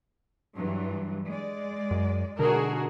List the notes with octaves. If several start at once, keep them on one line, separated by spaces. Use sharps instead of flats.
G2 E3 F#3
G#3 D5
F#2
B2 D3 F#4 G#4 A#4